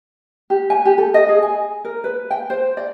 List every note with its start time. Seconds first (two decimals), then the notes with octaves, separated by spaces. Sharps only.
0.50 G4
0.70 G#5
0.85 G4
0.98 A4
1.14 D#5
1.29 G#4
1.43 G#5
1.84 A#4
2.04 B4
2.31 G5
2.50 C5
2.77 D5